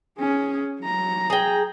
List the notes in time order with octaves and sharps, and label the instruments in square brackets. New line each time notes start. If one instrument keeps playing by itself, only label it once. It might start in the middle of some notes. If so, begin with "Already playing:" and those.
[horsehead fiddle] C#4 G#4
F#3 A#5
[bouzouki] G#4 G5